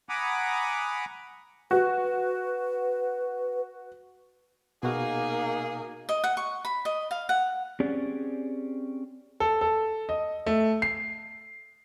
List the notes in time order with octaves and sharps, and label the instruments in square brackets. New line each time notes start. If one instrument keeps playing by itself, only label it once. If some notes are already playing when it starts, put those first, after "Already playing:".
[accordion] F#5 G#5 A#5 B5 D6 D#6
[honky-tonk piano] F#4 [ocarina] B4
[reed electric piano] B2 F#4 F5 [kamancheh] A#3 D#4 [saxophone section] G#4
[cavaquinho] D#5
F#5
C#6
B5
D#5
F5
F#5
[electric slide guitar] C4 C#4 G4 G#4 D5
[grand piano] A4
A4
D#5
A3
C7